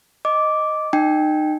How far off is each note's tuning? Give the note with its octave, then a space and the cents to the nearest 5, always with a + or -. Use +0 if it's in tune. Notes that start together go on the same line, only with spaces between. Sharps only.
D#5 +0 D6 -5
D#4 -30 G5 +0